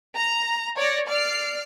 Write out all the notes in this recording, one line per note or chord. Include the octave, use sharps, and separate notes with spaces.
A#5
C#5 D5 A#6
D5 F6 C7 D7